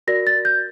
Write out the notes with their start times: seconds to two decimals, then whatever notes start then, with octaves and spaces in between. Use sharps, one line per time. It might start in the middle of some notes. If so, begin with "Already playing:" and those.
0.07 F#4 A#4 D5 A#6
0.27 A6
0.45 G6